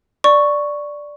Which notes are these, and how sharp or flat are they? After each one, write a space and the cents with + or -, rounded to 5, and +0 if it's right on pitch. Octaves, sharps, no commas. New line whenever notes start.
D5 +0 C#6 +0